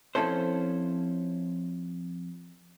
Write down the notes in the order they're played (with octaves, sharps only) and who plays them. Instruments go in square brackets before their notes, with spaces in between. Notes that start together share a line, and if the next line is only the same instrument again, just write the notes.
[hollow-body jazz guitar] F2 G#2 C#4 E4 A4 C5